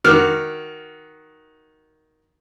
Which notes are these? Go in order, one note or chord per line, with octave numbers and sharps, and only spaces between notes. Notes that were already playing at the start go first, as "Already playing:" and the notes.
D#3 F#4 D6 F6